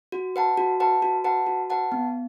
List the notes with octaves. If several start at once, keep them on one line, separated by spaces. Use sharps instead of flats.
F#4
B4 F#5 A5
F#4
B4 F#5 A5
F#4
B4 F#5 A5
F#4
B4 F#5 A5
B3